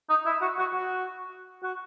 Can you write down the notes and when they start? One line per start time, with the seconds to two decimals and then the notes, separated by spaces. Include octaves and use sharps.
0.09 D#4
0.26 E4
0.41 F#4
0.59 F#4
0.75 F#4
1.63 F#4